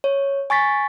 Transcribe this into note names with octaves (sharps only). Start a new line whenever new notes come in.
C#5
G#5 C#6 A6 B6